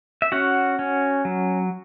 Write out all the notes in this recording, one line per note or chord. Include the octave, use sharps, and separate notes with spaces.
E5
C#4 F#4 F#5
C#4
F#3